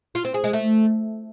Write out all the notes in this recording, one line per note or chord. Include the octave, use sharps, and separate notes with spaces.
F4
C4
G#4
G#3
A3